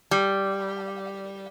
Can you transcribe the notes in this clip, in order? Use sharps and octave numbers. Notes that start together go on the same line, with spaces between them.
G3